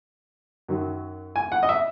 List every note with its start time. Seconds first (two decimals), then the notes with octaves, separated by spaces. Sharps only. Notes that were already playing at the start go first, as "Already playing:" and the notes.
0.68 F#2 D#3 F#3
1.36 G#5
1.52 F#5
1.63 D#5
1.69 E5